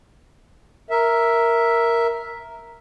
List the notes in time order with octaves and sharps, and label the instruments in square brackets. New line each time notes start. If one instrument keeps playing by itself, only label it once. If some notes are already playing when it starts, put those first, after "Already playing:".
[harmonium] A#4 E5